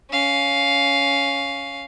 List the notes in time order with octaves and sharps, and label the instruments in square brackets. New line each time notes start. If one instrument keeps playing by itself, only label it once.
[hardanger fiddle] C#4 F5